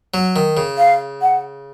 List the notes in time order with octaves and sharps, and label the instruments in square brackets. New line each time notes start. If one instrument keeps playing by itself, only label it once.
[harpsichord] F#3
D#3
C#3
[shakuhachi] F5
F#5